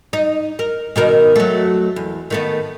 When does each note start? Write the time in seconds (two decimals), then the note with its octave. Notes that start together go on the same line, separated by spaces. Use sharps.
0.13 D#4
0.59 A#4
0.96 B2 D#3 A#4
1.36 F#3 A3
1.96 E2
2.30 D#3 A3 B3